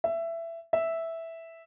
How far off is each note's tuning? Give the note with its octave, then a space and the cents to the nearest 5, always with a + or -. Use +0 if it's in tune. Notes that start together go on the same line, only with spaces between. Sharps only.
E5 +15
E5 -5